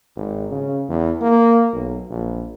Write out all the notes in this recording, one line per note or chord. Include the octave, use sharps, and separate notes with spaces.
G#1
C#3
E2
A#3
B1
A#1